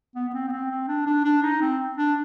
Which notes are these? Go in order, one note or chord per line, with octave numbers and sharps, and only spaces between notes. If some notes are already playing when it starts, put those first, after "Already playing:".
B3
B3
C4
B3
C4
C4
D4
D4
D4
D#4
C4
D4